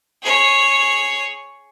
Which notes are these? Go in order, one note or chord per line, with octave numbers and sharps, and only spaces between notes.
G#4 C#5